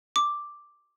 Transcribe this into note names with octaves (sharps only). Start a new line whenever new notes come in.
D6